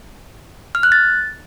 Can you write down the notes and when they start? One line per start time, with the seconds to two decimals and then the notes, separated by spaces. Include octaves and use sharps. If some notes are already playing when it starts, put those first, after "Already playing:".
0.75 F6
0.83 F#6
0.92 A6